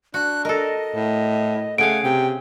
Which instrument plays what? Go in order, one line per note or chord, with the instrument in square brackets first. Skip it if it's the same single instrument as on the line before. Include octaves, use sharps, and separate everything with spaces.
[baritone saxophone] D4 [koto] F#4 [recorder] F#6
[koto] A4 A#4 [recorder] D#5
[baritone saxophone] A2
[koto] C#3 G#4 F5 [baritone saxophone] A3 [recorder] F#5 [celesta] D7
[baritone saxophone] C3 [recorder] G5